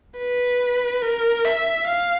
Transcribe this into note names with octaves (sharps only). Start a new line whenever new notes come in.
B4
A#4
E5
F5